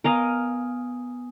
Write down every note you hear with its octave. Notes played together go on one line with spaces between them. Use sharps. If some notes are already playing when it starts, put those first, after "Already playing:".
B3 A#4 D#5 F5 G#5 D#6